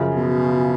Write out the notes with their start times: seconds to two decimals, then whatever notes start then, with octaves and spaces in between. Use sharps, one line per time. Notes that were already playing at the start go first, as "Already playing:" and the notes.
Already playing: F#2 C#3 F3
0.14 B2